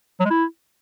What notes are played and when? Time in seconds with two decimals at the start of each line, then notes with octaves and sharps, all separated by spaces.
0.20 F#3
0.25 G#3
0.30 E4